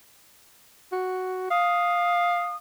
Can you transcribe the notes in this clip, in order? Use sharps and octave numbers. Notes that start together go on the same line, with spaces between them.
F#4
F5 D#6